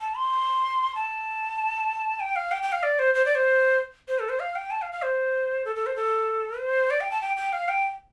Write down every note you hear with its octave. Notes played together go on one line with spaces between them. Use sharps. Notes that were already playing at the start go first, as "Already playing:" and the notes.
A5
C6
A5
G5
F5
G5
G5
F5
D5
C5
C5
D5
C5
C5
A4
C5
F5
G5
A5
F5
F5
C5
A4
A4
C5
A4
C5
D5
G5
A5
G5
G5
F5
G5